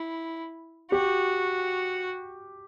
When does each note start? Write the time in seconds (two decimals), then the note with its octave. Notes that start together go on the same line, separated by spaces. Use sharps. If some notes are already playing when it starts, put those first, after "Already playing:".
Already playing: E4
0.91 F#4 G4